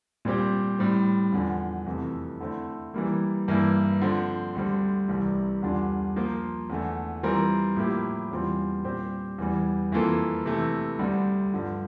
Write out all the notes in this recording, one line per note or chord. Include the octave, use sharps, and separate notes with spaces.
A#2 G3 C4 G4
A2 G3 C4
E2 D3 F3
F2 C3 E3 A3
D3 A3 C4 E4
E3 G3 A#3
G2 E3 A#3 E4
D3 F3 C4
D2 D3 G3 C4
C2 C3 E3 G3
E2 D3 G3 D4 F4
F3 A#3 F4 C5
E2 D3 A3
E3 G3 C4 F4 A#4
A2 F3 A#3 E4 G4
E2 E3 G3 C4 F4
A#2 G3 C4 G4 C5
E2 E3 G3
F2 E3 A#3 F4 A4
C3 E3 A3
D2 D3 G3
G2 D3 F3